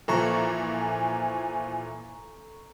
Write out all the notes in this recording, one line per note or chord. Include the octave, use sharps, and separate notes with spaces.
A#2 E3 F3 A4 G#5 A#5 C#6